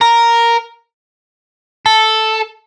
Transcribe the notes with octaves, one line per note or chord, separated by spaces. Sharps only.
A#4
A4